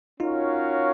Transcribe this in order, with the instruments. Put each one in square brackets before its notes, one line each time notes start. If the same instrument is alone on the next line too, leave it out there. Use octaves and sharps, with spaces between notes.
[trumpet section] C#4 F#4 A#4 C#5 F5 [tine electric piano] D#4 F4